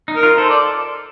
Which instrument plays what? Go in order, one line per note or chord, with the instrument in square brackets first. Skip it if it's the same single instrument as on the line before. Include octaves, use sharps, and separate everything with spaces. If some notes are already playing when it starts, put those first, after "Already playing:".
[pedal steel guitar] D#4
[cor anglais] A#4
[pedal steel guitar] F4
[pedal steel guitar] A4 [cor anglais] C5
[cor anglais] D5